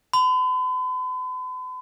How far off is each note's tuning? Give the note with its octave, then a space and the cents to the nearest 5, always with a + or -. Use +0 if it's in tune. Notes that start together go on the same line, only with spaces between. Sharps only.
B5 +45